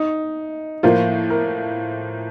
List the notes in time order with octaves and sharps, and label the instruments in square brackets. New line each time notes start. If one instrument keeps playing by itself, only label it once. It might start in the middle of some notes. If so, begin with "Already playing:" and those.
Already playing: [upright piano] D#4
[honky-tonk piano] A2 F3 A#3 [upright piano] F4
[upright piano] A#4